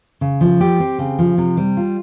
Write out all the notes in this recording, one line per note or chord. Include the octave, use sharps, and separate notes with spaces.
C#3
F3
G4
C4
C#3
F3
C3
G3
F4